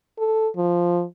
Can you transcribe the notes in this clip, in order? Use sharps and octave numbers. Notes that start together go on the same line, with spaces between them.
A4
F3